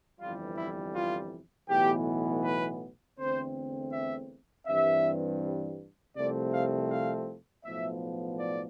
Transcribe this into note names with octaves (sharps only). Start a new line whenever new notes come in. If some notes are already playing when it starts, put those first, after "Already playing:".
G1 F2 C3 E3 G3 F4
E4
F4
B1 A2 E3 B3 G4
B4
E2 D3 A3 C4 C5
E5
G2 E3 G3 C4 E5
C2 C3 F3 A3 C4 D5
F5
F5
B1 A2 F3 B3 E5
D5